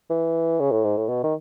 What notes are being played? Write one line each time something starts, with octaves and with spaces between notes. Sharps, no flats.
E3
C#3
A2
G#2
A2
B2
D#3